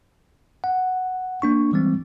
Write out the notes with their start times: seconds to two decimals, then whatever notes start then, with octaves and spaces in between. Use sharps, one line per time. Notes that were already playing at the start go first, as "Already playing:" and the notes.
0.64 F#5
1.42 A#3 D4 C#6
1.73 E3 G3 G#3 C4